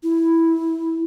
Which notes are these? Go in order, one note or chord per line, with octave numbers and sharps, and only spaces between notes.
E4